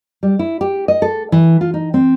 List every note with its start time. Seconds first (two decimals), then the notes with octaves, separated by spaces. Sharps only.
0.23 G3
0.39 E4
0.61 G4
0.88 D#5
1.02 A4
1.32 E3
1.61 F4
1.74 D#4
1.94 C4